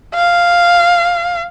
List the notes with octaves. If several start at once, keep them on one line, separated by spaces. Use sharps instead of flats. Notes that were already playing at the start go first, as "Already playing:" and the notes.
F5